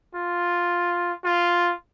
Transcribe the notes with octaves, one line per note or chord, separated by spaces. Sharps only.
F4
F4